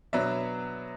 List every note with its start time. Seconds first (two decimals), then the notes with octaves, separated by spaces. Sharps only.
0.13 B2 F#3 B3 D4 E5